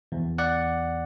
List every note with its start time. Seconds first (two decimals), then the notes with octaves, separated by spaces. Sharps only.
0.12 E2
0.38 D5 F#5